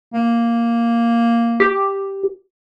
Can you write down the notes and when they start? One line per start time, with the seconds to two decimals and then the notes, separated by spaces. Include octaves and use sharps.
0.14 A#3
1.60 G4